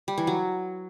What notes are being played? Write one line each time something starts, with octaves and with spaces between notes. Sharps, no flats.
G3
E3
F#3